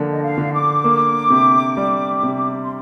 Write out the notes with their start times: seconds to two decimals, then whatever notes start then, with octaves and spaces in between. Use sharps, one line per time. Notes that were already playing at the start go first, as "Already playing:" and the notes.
Already playing: D3 F3 A#3
0.11 D#5
0.22 F5
0.38 D3
0.53 D6
0.84 A#3
1.30 C3
1.77 G3
2.23 C3
2.64 C6